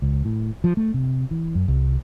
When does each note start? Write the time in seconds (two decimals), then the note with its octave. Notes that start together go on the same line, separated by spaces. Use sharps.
0.02 C#2
0.25 A2
0.64 F3
0.77 A3
0.94 C3
1.31 E3
1.55 F#2
1.68 C2